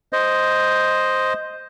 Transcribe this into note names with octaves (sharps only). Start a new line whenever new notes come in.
C5 D#5